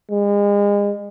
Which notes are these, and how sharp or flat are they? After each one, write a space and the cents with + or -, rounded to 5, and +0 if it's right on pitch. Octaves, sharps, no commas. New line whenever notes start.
G#3 -35